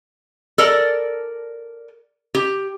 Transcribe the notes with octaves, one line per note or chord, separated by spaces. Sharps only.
A4 A#4 D5
G4